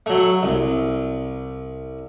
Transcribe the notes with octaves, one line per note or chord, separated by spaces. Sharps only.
F#3 A3
C2